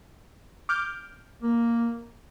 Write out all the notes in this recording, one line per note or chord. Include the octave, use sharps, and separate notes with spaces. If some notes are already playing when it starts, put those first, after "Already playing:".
D6 F6 G6
A#3